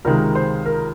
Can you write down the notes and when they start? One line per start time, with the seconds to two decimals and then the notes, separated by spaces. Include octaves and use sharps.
0.05 C#2 C3 D#3 G#3 A#4
0.35 C5
0.66 A#4